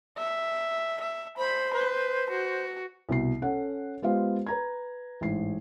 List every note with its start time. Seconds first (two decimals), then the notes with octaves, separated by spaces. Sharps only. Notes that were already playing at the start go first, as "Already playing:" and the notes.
0.18 E5
1.00 E5
1.37 C5 B5
1.74 B4
2.30 F#4
3.09 C2 B2 C7
3.42 C#4 A4 F#5
4.02 G#3 B3 F4 G4 C5 F5
4.47 B4 A#5 G#6
5.21 A1 G#2 C7